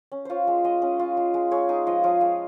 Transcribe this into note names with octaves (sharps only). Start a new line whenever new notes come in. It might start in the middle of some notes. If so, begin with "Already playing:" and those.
C#4
F4 C5 C#5
G#3
G#3 D#5
C#4
F4
G#3
G#3
G#3 C#5
D#4 G#4
F3 D#5
F3 F5
G#3 F5